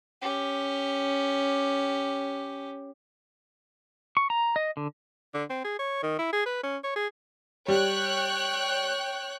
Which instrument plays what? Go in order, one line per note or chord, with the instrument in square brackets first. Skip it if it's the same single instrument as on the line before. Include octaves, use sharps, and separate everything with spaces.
[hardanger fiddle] C#4 G4
[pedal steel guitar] C#6
A#5
D#5
D3
[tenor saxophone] D3
C4
G#4
C#5
D#3
E4
G#4
B4
C#4
C#5
G#4
[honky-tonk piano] G3 [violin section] C#5 G5 F#6